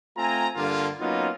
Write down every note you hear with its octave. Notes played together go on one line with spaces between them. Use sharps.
A3 C4 F4 G#5 A#5
G2 D3 A#3 F4
F#3 A#3 B3 C#4 D#4 F4